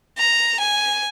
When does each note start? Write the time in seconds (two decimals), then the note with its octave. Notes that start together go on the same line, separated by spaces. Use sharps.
0.18 A#5
0.60 G#5